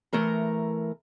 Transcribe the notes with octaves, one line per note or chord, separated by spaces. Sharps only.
E3 A3 A#4 A#5